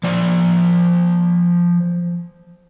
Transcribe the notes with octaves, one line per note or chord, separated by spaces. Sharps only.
F3 D5